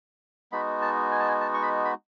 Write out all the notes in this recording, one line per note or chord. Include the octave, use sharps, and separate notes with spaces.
G#3 B3 D#4 F#4 B5
A5
G#5
A5
G#5
A5
C#6
B5
B5